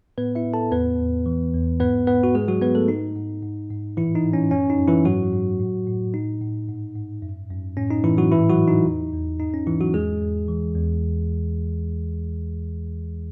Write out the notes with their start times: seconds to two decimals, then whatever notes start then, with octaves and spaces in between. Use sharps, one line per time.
0.18 A2 B3 B4
0.35 E4 E5
0.45 A2
0.53 A4 A5
0.72 E2 B3 B4
0.99 E2
1.26 E3
1.54 E2
1.80 G#2 B3 B4
2.07 G#2 B3 B4
2.23 F#4
2.35 G#2 G#3 G#4
2.48 F#3 F#4
2.61 G#2 B3 B4
2.75 A3 A4
2.88 G#2 D#4
3.16 G#2
3.43 G#2
3.70 G#2
3.97 A2 E3 E4
4.15 D#4
4.24 A2
4.33 C#4
4.51 F#2 C#4
4.70 D#4
4.78 F#2
4.88 E3 E4
5.05 G#2 F#3 F#4
5.33 G#2
5.60 A2
5.87 A2
6.14 A2 D#4
6.41 A2
6.68 G#2
6.96 G#2
7.23 F#2
7.50 F#2
7.77 A2 C#4
7.91 D#4
8.04 A2 E3 E4
8.17 F#3 F#4
8.32 G#2 E3 E4
8.50 F#3 F#4
8.58 G#2
8.68 D#4
8.85 E2
9.13 E2
9.40 G#2 D#4
9.54 C#4
9.67 G#2 E3 E4
9.81 F#3 F#4
9.94 E2 G#3 G#4
10.21 E2
10.48 E3
10.76 E2